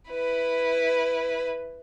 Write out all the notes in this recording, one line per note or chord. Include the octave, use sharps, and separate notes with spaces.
E4 B4